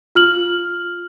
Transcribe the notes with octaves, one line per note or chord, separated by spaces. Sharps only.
F4 F6 F#7